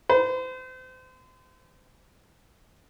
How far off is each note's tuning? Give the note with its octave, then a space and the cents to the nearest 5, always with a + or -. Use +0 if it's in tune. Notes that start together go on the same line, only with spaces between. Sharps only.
C5 -35